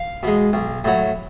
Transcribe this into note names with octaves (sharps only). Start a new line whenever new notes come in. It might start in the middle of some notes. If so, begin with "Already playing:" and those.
Already playing: F5
B2 G#3
B1
A2 F#3